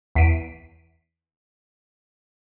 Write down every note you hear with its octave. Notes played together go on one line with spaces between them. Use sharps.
E2 B6 C7 D7 D#7